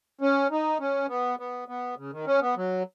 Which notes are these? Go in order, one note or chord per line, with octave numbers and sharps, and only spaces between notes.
C#4
D#4
C#4
B3
B3
B3
C#3
D#3
C#4
B3
F#3